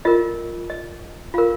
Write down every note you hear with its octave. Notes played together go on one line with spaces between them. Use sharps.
F4 A#4 D#5
D#5
F4 A#4 F5